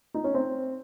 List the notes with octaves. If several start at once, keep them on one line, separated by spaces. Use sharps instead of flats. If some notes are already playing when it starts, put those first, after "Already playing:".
D#4
C#4
C4